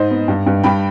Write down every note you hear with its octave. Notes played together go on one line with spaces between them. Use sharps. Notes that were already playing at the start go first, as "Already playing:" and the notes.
Already playing: G#2 C5 D#5
B3
G2
G2
G2 G5 B5